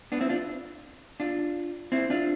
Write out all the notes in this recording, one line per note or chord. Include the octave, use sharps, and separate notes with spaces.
B3 D4
C4 E4
D4 F4
D4 F4
C4 E4
D4 F4